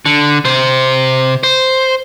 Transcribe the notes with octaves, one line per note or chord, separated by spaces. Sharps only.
D3
C3 C5
C5